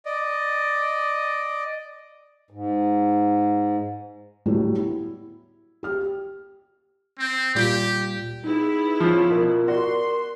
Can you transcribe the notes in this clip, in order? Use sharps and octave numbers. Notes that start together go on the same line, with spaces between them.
D5 D#5
G#2
A2 F#3 G3 B3
E4
G4 F6
C4
A#2 G3 F4 G4
B3 D#4 E4 G#4
F3 C#4 F4
B2 A#4
F#4 D5 C6